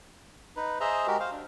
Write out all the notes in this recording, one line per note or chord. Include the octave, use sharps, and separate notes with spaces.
D#4 B4
G#4 C5 D#5 E5 A#5
G#3 F#4 G4 A#4
C5 F5
D4